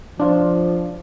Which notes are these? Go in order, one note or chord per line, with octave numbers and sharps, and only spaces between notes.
F3 D4 F4